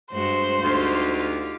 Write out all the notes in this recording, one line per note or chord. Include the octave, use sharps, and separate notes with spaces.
G2 G#3 F#4 C5
D2 D#4 F4 G4